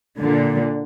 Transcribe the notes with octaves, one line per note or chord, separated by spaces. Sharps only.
A#2 D3